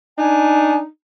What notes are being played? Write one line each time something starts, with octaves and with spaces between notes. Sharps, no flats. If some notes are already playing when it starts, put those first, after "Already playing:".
D4 D#4 G#5